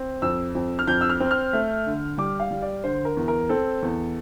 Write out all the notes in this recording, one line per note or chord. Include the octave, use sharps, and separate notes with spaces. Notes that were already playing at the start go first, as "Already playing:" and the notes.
Already playing: C4
F2 E6
F2
F6
F2 G6
E6
F6
C4
F6
A3
D3
G3 D6
F5
G3
D5
D3 C5
A#4
E2
A#4
C4 A4
E2